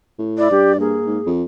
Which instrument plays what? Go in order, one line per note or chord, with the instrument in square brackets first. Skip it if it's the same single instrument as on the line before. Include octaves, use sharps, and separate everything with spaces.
[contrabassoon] A2
[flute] E4 [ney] D5
[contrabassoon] G2 [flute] G4
[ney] A#3 [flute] G#4
[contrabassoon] G#2
F2